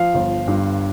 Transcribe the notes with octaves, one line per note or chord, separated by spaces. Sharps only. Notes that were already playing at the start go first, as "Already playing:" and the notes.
Already playing: F3 F5
G1
G2